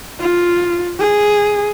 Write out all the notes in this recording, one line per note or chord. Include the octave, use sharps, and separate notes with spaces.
F4
G#4